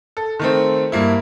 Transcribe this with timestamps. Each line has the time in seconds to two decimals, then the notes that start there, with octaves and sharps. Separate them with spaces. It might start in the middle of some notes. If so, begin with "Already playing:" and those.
0.17 A4
0.39 D#3 A3 C4
0.92 G2 A#3 E4